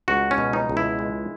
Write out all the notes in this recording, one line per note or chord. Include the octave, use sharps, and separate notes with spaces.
C#2 F#4
C#4
B2
D#4
C#2
E4
G#3